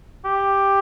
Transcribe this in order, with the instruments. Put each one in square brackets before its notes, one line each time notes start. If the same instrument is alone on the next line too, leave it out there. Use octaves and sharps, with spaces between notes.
[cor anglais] G4